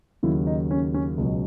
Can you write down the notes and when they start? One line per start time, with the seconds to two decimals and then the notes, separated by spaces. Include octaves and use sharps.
0.23 D#2 C#3 F#3 E4
0.47 D#4
0.71 C#4
0.94 C#4
1.17 C#2 B2 F#3